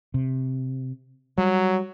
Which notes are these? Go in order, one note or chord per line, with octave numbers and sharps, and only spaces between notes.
C3
F#3 G3